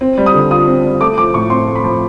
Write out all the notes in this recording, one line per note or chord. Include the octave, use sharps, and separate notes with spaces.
C4
G3
D#6
D3
F4 D#6
C4
G3
A3 D6
F3 D6
A2 C#6
C4 C6
A3
B5
F3